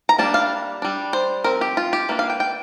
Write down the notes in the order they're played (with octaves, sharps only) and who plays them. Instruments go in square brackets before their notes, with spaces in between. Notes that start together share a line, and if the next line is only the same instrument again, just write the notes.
[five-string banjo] A#5
G3 A#3 D4 A5
F5
G3 D4
C5
F3 C4 A#4
G4
F4
G4
E3 A#3 D4
F5
G5
G5